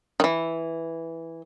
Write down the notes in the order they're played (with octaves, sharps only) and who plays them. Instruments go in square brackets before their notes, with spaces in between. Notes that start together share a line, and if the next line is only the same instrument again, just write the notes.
[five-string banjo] D#3 E3